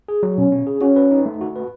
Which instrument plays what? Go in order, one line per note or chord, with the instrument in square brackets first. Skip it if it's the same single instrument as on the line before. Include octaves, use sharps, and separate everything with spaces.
[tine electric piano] G#4
F#3
[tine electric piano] B2 [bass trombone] C#4
[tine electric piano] C#4
G#4
[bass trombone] C#4 [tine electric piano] F#4
[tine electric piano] B4
D#4
A3
F#4
B4